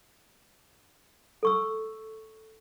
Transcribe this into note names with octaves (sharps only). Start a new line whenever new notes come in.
A4 C#6 E6